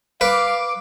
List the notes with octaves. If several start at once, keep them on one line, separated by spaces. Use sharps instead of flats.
B4 F5 D6